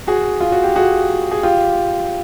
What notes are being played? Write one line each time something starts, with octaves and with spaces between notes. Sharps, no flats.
F#4 G#4
F4
F#4
G4
F#4 G#4
G#4
F4 G4